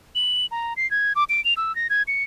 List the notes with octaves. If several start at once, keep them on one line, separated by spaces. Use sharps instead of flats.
F#7
A#5
C7
G#6
D6
D7
F7
E6
A#6
G#6
C#7